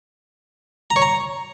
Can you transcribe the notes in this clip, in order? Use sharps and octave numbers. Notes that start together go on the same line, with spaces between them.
A#5
C#5
A#5